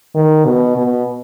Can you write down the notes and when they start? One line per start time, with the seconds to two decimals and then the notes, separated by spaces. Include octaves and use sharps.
0.15 D#3
0.45 B2
0.77 B2